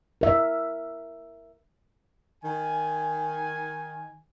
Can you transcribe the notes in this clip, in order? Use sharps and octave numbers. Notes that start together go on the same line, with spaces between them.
A#4 E5
D#3 G#5